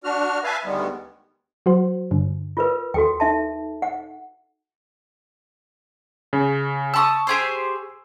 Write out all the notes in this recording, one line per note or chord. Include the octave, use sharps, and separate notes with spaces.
D4 F#4 F6
B4 E5 F5 G#5 A5
D2 D#3 G3 G#3 B3
F#3 F#4 C5
G2 D3
F4 A#4 B4
D#2 F#4 A4 G5
D#4 E5 A5
F#5
C#3
A5 B5 C#6 D#6 E6
G4 G#4 C5